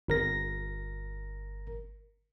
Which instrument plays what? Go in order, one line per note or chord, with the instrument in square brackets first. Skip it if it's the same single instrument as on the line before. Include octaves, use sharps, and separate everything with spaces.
[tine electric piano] G1 A#4 A#6